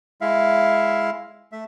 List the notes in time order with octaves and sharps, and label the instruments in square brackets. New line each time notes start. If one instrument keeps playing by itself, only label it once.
[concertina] G#3 E4 E5 F5
A3 E5